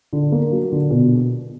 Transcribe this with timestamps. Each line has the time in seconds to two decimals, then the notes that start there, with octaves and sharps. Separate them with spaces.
0.13 D3
0.32 A#3
0.52 F#3
0.72 D3
0.91 B2